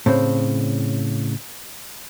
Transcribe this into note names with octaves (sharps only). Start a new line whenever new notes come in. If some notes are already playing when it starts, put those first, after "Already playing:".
A2 C#3 C4